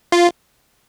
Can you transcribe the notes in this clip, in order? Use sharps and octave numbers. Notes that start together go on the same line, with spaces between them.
F4